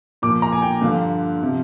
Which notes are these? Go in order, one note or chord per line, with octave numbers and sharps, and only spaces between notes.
A#2 F3 D6
A#5
G#5
G5
G2 D3 F3 F5
C3 F3